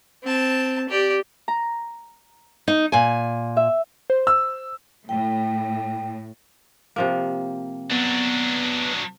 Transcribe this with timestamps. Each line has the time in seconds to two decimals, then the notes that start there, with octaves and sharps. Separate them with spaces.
0.23 C4 A5
0.89 G4 D5
1.48 A#5
2.68 D#4
2.92 A#2 G#5
3.57 E5
4.10 C5
4.27 E6
5.09 A2 G5
6.96 C3 F3 A#3
7.91 F#3 B3 D4